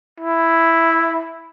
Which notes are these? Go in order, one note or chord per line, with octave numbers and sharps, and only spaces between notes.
E4